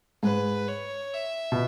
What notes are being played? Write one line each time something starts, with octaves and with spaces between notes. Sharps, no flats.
G#2 B4
C#5
E5
B2